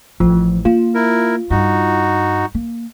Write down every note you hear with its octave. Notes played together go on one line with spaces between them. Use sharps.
A1 F3
A#3 F4
E4 A#4
G2 D#4 F#4
A#3